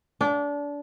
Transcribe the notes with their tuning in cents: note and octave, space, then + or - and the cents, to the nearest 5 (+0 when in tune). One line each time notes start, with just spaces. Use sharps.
D4 -25